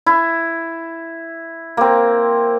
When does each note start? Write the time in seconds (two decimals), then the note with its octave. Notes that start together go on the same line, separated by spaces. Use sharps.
0.06 E4
1.77 A#3 C4